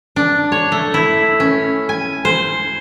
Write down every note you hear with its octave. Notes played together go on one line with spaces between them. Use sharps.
D4
C#5
A3
E4
C#4
G#5
C5